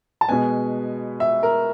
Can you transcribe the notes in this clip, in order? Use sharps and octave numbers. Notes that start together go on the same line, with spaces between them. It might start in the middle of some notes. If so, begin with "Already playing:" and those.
A5
B2 G#3 B3 G#5
E5
A#4